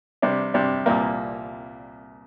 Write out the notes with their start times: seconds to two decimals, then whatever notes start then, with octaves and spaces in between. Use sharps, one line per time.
0.22 C3 G3 D4
0.54 C3 G3 D4
0.86 C2 A#2 G3 A#3